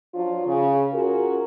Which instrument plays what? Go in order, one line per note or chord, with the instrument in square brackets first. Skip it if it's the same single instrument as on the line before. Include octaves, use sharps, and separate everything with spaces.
[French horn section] F3 F#3 D4 F4
C#3
C#4 F4 F#4 G#4 A#4